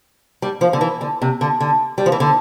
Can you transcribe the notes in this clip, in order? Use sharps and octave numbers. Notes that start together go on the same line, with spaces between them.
G3
F3
D3
E3
D3
C3
D3
D3
G3
F3
E3
D3